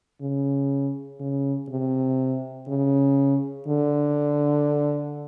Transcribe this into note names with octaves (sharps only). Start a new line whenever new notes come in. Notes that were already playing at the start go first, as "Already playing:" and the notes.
C#3
C#3
C3
C#3
D3